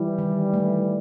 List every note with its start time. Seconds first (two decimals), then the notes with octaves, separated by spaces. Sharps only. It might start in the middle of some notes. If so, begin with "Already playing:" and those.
Already playing: E3 G3 E4
0.19 D#3
0.54 A3